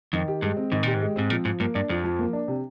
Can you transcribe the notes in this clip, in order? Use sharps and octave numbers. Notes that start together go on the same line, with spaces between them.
F2 D#3
G4
G2 G#3
C4
G#2 D#3
A#2 G4
G#2
G#3
G#2 C4
A#2 F3
G#2 F3
G2 A#3
G2 D4
F2 F3
F3
A#3
D4
C3